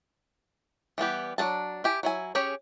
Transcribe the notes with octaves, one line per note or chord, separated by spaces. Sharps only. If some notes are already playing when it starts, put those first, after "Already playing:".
E3 G3 B3 G4
F#3 D4 G#4 A5
E4 G4 G#5
F#3 E4 G#5
C#4 G4 G#4 C#5